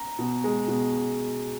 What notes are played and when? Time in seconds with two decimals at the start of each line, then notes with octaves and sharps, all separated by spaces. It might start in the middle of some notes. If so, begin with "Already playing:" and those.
Already playing: A#5
0.19 B2
0.44 G#3
0.68 B2